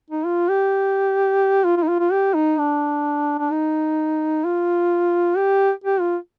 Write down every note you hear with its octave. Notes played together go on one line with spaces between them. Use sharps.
D#4
F4
G4
F4
F4
D#4
F4
F4
G4
D#4
D4
D4
D#4
F4
G4
G4
F4